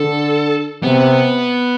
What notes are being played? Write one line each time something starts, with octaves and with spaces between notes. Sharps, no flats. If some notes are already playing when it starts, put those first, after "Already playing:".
Already playing: D3 A4
C3 B3